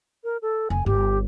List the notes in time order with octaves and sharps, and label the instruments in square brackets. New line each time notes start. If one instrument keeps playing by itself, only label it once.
[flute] A#4
A4
[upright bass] F1 [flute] G#5
[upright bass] G1 [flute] G4